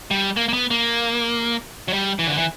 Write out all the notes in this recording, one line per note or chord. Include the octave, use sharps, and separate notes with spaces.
G3
A#3
A#3
B3
A#3
F#3
G3
E3
D3
E3